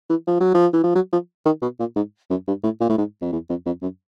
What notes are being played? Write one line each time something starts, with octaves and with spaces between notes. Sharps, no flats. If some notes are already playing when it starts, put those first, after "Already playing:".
E3
F3
F#3
F3
E3
F3
F#3
F3
D#3
B2
A#2
G#2
F#2
G2
A2
A#2
A2
G#2
F2
E2
F2
F2
F#2